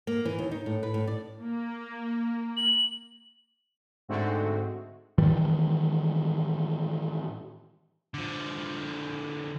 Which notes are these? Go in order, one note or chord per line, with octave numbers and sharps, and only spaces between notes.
A#3
E3
D#2
D#4
A2
B4
A2
D5
A#3
F#7
G#2 D3 G#3 A3 C4 F#4
A2 D#3 E3 G3
D3 F3